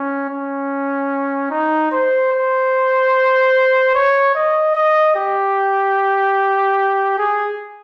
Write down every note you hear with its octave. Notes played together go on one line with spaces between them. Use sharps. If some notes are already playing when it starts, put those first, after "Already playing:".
Already playing: C#4
C#4
D#4
C5
C5
C#5
D#5
D#5
G4
G#4